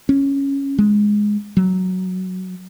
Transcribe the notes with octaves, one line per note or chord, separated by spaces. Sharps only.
C#4
G#3
F#3